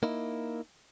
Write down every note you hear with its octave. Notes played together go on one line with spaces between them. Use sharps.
A#3 D#4 E4